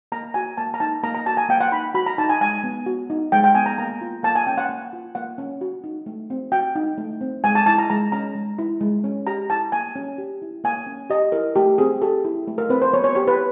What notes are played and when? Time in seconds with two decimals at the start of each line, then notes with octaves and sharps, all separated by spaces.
0.12 A#3 A#5
0.34 F#4 G#5
0.57 A#3 A5
0.74 A#5
0.80 D#4 A5
1.03 A#3 A#5
1.15 A#5
1.26 F#4 A5
1.37 G#5
1.49 A#3 G5
1.61 F#5
1.72 D#4 B5
1.94 F#4 B5
2.06 A#5
2.18 D#4 A5
2.29 G#5
2.41 G#3 G#5
2.64 B3
2.86 F#4
3.10 D#4
3.32 G#3 G5
3.44 G5
3.55 B3 G#5
3.66 A#5
3.78 A#3 A#5
4.01 F4
4.23 A#3 A5
4.35 G#5
4.47 C#4 G5
4.58 F#5
4.69 A#3
4.93 F4
5.15 A#3 F#5
5.38 C#4
5.61 F#4
5.84 D#4
6.06 A3
6.30 C4
6.52 F#4 G5
6.75 D#4
6.98 A3
7.21 C4
7.44 G#3 G#5
7.55 A5
7.66 E4 A5
7.78 A#5
7.90 G#3 A#5
8.12 C#4 A#5
8.35 G#3
8.58 E4
8.81 G#3
9.04 C#4
9.27 G4 A#5
9.50 E4 A5
9.72 A#3 G#5
9.96 C#4
10.18 G4
10.42 E4
10.64 A#3 G#5
10.86 C#4
11.10 G4 D#5
11.32 E4 A#4
11.56 A3 G4
11.78 C4 G#4
12.02 G4 A4
12.25 E4
12.47 A3
12.58 A#4
12.70 C4 B4
12.82 C5
12.93 B3 C#5
13.04 C#5
13.15 G4 C#5
13.27 B4